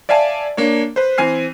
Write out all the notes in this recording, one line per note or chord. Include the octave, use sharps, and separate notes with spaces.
D5 E5 F5 G#5 A5
A#3 D4 C#5
B4 C5
E3 C4 G#5 F6 C7